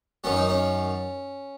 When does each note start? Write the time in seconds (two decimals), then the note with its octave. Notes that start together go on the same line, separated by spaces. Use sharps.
0.24 F#2 D#3 F#3 C#4
0.36 D#4
0.49 C#4